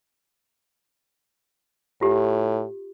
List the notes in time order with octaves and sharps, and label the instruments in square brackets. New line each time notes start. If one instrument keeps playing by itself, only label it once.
[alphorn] A2 [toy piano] F4 G4